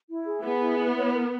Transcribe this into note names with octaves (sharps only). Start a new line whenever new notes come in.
E4
G#4
B3 G#4
E4
E4
C#5
A#4